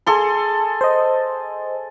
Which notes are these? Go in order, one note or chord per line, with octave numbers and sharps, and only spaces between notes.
G#4 A4 C6
C5 D#5